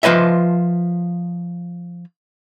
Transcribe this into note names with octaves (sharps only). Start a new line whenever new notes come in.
F3 F4 B4 D#5 E5